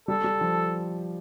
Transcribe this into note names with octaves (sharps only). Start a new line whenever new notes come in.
G3 A4
G3
F3